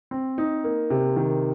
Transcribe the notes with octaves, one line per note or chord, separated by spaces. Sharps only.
C4
D#4
A#3
C3
D#3